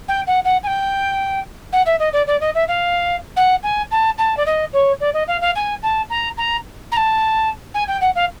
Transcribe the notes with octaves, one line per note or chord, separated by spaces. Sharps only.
G5
F#5
F#5
G#5
G5
F#5
E5
D#5
D5
D5
D#5
E5
F5
F#5
G#5
A5
A5
D5
D#5
C#5
D5
D#5
F5
F5
G#5
A5
A#5
A#5
A#5
A5
G#5
G5
F#5
F5